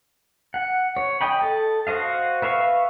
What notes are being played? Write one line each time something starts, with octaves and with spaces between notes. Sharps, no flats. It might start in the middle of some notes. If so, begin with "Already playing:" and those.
F#5
C#5
D#5 G5 B5
A4
F#4 C5 D#5 F5
B4 E5 F5 C#6